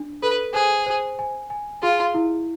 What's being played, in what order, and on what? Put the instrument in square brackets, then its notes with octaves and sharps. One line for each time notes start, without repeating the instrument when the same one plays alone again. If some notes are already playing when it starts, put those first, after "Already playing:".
Already playing: [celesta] D4
[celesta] A4 [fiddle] B4
[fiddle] G#4 [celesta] C5
[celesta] C5
G#5
G#5
[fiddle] F4 [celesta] G#4
[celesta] E4